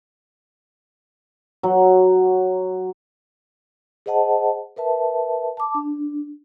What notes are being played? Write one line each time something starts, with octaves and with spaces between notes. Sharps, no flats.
F#3
G#4 C5 D#5 F#5 A5
A#4 B4 E5 A5
A5 D6
D4